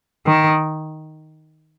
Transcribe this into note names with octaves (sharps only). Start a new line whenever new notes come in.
D#3